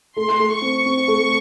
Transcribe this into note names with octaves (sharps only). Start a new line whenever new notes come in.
A3 C6
A3
C#6
C4
C4
A3